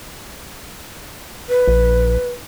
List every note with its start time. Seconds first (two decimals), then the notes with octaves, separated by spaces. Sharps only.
1.49 B4
1.67 A#1